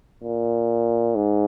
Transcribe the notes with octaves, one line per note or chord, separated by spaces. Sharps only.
A#2
G#2